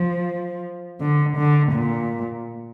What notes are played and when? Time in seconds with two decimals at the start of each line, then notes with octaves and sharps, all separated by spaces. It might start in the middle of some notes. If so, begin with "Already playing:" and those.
Already playing: F3
1.01 D3
1.37 D3
1.73 A#2